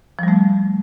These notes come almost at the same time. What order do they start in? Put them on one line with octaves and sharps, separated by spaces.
F3 G3 A3